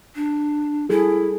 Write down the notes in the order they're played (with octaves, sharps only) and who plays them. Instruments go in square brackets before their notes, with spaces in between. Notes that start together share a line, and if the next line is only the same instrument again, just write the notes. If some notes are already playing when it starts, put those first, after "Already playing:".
[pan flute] D4
[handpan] G3 G#4 A4 [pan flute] E4